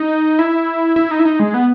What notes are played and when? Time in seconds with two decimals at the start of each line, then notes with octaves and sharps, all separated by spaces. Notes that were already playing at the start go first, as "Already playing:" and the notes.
Already playing: D#4
0.39 E4
0.96 E4
1.11 D#4
1.19 E4
1.25 D#4
1.39 G#3
1.54 B3